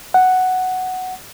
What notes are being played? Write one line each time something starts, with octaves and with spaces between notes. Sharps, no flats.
F#5